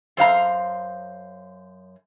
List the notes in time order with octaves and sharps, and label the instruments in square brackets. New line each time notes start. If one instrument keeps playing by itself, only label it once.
[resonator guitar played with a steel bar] F#2 C5 F5 A#5